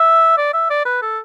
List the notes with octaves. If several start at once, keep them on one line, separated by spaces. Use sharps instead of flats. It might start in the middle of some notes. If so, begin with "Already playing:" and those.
Already playing: E5
D5
E5
D5
B4
A4